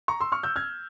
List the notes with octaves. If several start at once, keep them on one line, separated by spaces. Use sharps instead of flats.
A#5 C#6
C6 E6
C#6 F6
E6 G6
F6 G#6